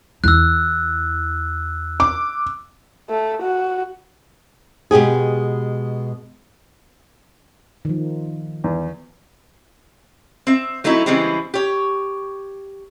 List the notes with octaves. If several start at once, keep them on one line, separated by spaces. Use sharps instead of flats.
E2 E4 E6 F#6
D6
A3
F#4
B2 G#3 G4 G#4
D#3 F3
E2
C4 E5
F#3 A3 C4 D#4 E4
C#3 E3 G3 G#3 B3 C4
G4 C#5